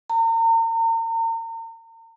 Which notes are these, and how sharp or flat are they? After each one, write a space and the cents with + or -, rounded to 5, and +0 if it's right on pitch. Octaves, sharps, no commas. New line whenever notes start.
A#5 -40